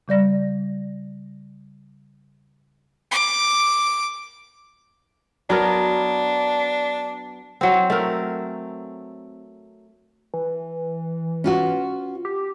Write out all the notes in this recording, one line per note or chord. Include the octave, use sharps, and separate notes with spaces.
C#3 G3 D5 A#6
D6
F#3 B3 D4 A#4
F#3 C4
A3 A#4
E3
C#4 F4 F#4
G4